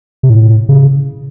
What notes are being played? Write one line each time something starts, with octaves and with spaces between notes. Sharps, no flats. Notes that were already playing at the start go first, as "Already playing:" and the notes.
C3
A2
C#3